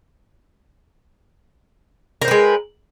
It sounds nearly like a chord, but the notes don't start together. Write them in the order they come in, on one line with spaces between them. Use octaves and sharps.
A#4 C4 B4 G#3